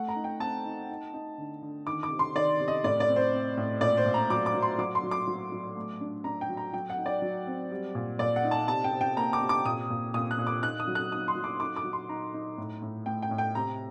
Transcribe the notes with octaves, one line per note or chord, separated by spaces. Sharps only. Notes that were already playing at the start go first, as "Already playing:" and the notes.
Already playing: A3 F#5
A#5
D#4
G5
C4 A5
D#4
D#4
D#4
D3
D3
D#3 D6
D6
C3
C6
D#3 D5
C3
D#5
A2 D5
D5
C4
C5
C4
A2
A#2 D5
C5
A#2
A#5
F#3 D6
D6
F#3
C6
F#3 D6
C6
F#3
D6
F#3
F#3
A3
D4
D4 A#5
G5
F#3
A#5
F#3 G5
F#5
D#4
D5
F#3
C4
G3
A#2
A#2 D5
F#5
D#4
A5
C3 A5
G5
C3
G5
A#3 A#5
D6
C3
D6
A#2 D#6
A#2
A#2 D#6
F#6
A#2
D6
D#4 F#6
D#6
F#3
F#6
D#4 D#6
C6
F#3
D6
D#4 D6
D6
F#3
C6
D#4 A#5
D#4
A2
A2
A3 G5
G5
A2
G5
C3 A#5